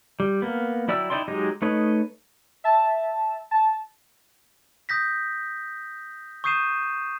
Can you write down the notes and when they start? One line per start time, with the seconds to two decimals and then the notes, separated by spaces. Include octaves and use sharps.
0.20 G3
0.42 A#3 B3
0.88 F#3 E4 D5 G5 E6
1.10 D#4 E4 D5 G5 C6
1.28 F#3 G#3 D#4 G4 D#5
1.62 A3 D#4 B4 C#5 D#5
2.64 E5 A5
3.51 A5
4.89 D#6 G6 A#6 B6
6.44 C#6 D#6 G6 C7 D#7 E7